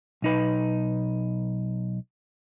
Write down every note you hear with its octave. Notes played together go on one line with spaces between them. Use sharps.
B1 D#4 B4